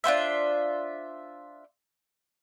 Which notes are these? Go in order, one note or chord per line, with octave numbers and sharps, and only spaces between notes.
D4 F4 C5 E5